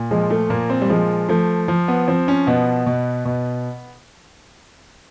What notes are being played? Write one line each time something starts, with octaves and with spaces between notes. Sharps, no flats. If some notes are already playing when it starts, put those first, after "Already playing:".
Already playing: A#2
F3 G#3
A3
A#2 A#3
C4
G3
F3 G#3
F3 A3
F3
B3
F3 C4
C#4
B2 B3
B2
B2